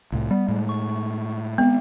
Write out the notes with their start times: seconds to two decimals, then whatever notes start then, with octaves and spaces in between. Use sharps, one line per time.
0.12 C2 A2
0.31 G3 B3
0.48 A2 G#3
0.69 C#6
1.58 G#3 B3 C4